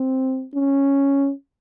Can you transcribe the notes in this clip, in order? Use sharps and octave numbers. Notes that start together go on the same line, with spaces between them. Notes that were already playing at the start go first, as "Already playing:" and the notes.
Already playing: C4
C#4